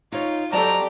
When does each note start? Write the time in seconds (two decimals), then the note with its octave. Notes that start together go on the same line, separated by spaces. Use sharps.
0.12 D#4 F4 C#5 D#5
0.53 F#3 C4 G4 A4 D5 D#5 A5 A#5